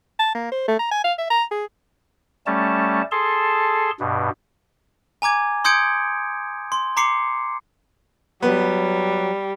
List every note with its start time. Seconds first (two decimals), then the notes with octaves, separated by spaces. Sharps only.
0.19 A5
0.35 A#3
0.52 C5
0.68 A3
0.79 A#5
0.91 G#5
1.04 F5
1.18 E5
1.30 A#5
1.51 G#4
2.46 G3 A3 C#4 A5
3.12 G#4 A4 A5 C6
4.00 G2 B2
5.22 G#5 A#5 D6 G#6
5.64 C6 D#6 G6 G#6 C#7 D7
6.72 C6
6.97 A#5 C6 D6 C7 C#7
8.42 F#3 G3 B3